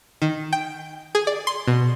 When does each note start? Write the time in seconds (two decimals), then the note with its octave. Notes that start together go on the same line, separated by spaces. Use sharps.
0.22 D#3
0.53 G5
1.15 G#4
1.27 D5
1.47 C6
1.67 B2